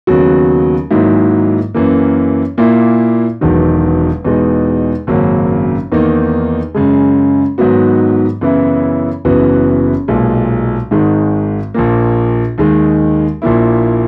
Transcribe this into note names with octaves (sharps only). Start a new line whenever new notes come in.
D#2 C#3 F#3 B3 F#4
G#2 D#3 F#3 A#3 E4
F#2 E3 A#3
A#2 A#3 E4
E1 E2 D#3 F#3
E2 B2 G#3 D#4
G#1 F#2 C#3 F#3 A#3
E2 D#3 A#3 D#4
F#2 C#3 G#3
G#2 D#3 F#3 B3 F#4
F#2 C#3 E3 B3 E4
F#1 F#2 E3 B3 F#4
B1 A#2 G#3
G#1 G#2 D#3 G#3
A#1 A#2 A#3
D#2 D#3 G#3
A#1 A#2 A#3 E4